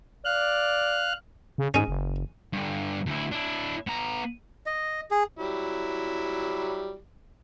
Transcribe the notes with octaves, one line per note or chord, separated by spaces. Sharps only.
D5 F5 F6 F#6
C#3
G#2 G#3 C#4
F#1
G2 D3
D2 E4
D4 E4
B3 A#5
D#5
G#4
F#3 G3 E4